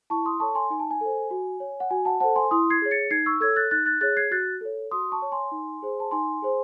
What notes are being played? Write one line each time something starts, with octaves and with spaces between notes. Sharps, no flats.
E4 A5 C#6
C6 D#6
A4 C#5 A5 C#6
G#5 C6
D#4 G#5
A5
G#5
A4 C5
F#4
C#5
F#5
F#4 G#5
F#5 A5
A4 C5 F#5 A5
G#5 C6
E4 C6 D#6
G#6 C7
G#4 C#5
A6 C#7
D#4 G#6 C7
C#6 E6
A4 C#5 E6 G#6
F#6 A6
D#4 F#6 A6
F#6 A6
G#4 C#5 F#6 A6
G#6 C7
F#4 F#6 A6
A4 C#5
F#4 C6 D#6
A5 C#6
C#5
G#5 C6
D#4
G#4 C5
A5
D#4 G#5 C6
G#4 C5